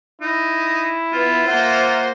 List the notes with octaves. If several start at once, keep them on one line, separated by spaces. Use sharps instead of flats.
D#4 E4
B3 F4 E5
A#3 C5 F#5